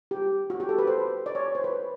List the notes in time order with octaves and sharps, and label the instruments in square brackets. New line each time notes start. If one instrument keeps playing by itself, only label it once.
[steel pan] G4
F#4
G4
A4
B4
C5
D5
C#5
C5
B4